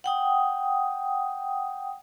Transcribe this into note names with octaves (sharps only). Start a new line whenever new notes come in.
F#5 G5 D#6